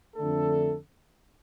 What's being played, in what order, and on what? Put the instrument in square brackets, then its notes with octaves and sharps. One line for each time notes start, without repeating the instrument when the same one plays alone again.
[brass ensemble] F2 D3 A3 D4 A4